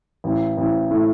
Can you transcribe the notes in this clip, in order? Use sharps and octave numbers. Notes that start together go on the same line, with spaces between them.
A1
A1
A2